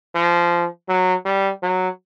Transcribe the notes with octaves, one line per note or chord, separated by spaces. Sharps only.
F3
F#3
G3
F#3